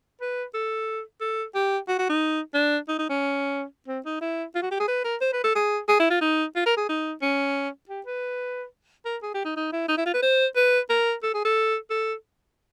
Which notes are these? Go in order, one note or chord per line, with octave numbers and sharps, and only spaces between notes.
B4
A4
A4
G4
F#4
F#4
D#4
D4
D#4
D#4
C#4
C4
D#4
E4
F4
F#4
G4
G#4
B4
A#4
C5
B4
A4
G#4
G#4
E4
F4
D#4
F4
A#4
G#4
D#4
C#4
G4
B4
A#4
G#4
G4
D#4
D#4
E4
D#4
E4
F4
B4
C5
B4
A#4
A4
G#4
A4
A4